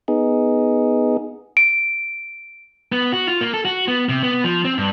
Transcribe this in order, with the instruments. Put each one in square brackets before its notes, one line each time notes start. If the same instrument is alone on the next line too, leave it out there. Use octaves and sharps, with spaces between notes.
[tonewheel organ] B3 D#4 G#4
[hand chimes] D7
[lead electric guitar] B3
F#4
F4
A#3
A4
F#4
B3
C3
B3
F3
C4
G2